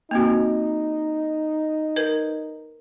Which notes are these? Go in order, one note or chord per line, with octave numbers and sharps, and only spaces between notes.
A#3 C4 D#4 F#4
A#4 B4